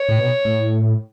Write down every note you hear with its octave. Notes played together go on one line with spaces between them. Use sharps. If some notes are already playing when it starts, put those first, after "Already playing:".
Already playing: C#5
A2
B2
A2